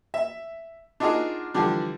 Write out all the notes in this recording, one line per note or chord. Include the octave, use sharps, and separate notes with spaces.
E5
D4 D#4 F4 F#4 G#4 A#4
D3 E3 F3 G3 D4